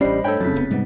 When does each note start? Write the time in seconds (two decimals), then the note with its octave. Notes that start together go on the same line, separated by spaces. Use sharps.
0.01 A1 G3 C#4 D4 C5 D#5 B5 C7
0.24 G2 A3 D4 A4 C#5 G5 B5 G6
0.40 F2 C#3 F#3 A6 B6
0.54 F1 A#2 B3
0.70 G#2 C3 G3 G#3 B3